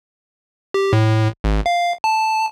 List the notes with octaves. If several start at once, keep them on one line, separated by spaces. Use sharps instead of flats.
G4
A2
G#1
F5
A5